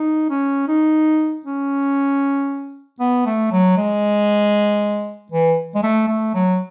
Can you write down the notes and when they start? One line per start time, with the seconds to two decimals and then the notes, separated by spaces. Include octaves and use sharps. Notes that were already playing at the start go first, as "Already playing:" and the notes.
Already playing: D#4
0.30 C#4
0.68 D#4
1.46 C#4
3.00 B3
3.26 A3
3.51 F#3
3.77 G#3
5.32 E3
5.75 G#3
5.83 A3
6.08 A3
6.34 F#3